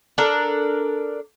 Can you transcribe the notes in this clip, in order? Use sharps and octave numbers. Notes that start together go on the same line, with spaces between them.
D4 A4 A#4